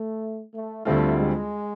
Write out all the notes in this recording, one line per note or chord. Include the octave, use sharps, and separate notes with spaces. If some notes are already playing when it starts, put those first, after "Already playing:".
Already playing: A3
A3
D2 D3 G3 A3 C4 F4
G#3